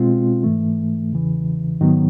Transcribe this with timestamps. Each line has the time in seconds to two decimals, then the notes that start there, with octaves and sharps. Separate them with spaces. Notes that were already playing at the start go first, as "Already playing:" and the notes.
Already playing: B2 G#3 C4 F4
0.43 G#2 E3 A3
1.12 E2 C#3 E3
1.80 G#2 D#3 F#3 B3